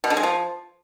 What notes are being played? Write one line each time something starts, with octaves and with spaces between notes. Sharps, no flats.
B2
D3
G#3
F3